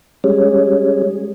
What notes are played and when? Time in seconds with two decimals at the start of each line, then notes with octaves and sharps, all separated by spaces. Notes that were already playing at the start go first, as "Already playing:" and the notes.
0.24 G3 G#3 C#4